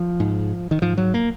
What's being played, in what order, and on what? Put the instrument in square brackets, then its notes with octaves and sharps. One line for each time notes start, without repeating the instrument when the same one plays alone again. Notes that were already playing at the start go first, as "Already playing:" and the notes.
Already playing: [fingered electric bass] F3
G#2
D#3
G#2 F3
F#3
A#3